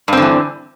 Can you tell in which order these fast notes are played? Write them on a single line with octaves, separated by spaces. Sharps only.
G2 C4 D3 E3